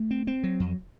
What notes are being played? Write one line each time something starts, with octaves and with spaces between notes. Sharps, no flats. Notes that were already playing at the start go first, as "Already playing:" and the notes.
Already playing: A3
C4
C4
F#3
F2